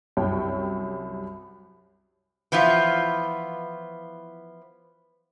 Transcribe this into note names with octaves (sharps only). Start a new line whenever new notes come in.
C2 F#2 C#5 G5
E3 F3 B3 F4